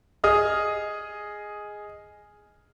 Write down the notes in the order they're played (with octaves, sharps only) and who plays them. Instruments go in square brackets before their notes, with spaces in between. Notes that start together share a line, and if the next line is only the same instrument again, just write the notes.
[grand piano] G#4 D#5 D#6 F6